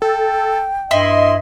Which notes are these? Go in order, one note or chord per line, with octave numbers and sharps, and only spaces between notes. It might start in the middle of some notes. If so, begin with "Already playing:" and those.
A4 G5
G2 E4 D#5 C6